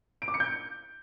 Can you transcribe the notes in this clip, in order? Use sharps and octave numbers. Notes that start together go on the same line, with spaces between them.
D7
D6
C#7
G6